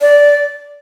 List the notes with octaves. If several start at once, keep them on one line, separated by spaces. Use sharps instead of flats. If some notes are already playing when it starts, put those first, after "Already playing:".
D5